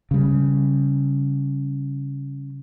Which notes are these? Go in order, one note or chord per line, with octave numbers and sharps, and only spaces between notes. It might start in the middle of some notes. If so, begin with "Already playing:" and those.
C#3 G3